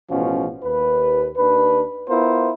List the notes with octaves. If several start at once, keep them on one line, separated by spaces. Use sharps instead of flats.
A1 B2 F3 C#4 F#4
D#2 B4
D#2 D4 B4
B3 E4 F4 A#4 C5